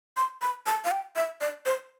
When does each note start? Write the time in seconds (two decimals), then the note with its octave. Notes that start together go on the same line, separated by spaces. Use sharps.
0.17 C6
0.42 B5
0.66 A5
0.84 F5
0.91 G5
1.16 E5
1.41 D5
1.66 C5